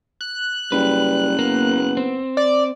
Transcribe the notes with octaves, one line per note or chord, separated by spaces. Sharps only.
F#6
F#1 G3 B4
A#3 B3
C4
D5